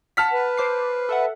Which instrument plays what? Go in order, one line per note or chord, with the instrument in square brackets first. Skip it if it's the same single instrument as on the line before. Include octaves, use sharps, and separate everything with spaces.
[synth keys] F#5 [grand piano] A5 F6 B6
[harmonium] B4
[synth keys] C5 D6 C7
A4 E5 F#5